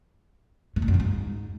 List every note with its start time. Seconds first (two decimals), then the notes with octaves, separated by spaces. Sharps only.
0.76 A2
0.82 A#2
0.88 F#2
0.94 A#2
1.00 G#2